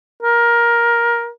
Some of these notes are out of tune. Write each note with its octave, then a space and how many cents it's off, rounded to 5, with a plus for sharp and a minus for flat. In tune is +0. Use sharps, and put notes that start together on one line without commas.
A#4 +15